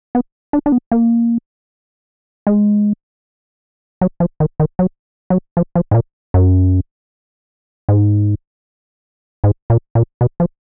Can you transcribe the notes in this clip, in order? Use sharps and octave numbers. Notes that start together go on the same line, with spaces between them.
B3
D4
D4
B3
A#3
G#3
F#3
F3
D#3
D#3
F#3
F#3
F3
F3
G#2
A#2
F#2
G#2
G#2
A#2
A#2
B2
F3